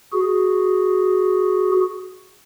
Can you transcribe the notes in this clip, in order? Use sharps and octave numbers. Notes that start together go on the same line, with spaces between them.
F#4 G#4